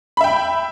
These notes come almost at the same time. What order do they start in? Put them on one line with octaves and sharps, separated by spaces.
B5 E5 G5